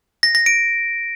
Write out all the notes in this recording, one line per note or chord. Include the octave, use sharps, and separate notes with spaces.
A#6
A#6
D7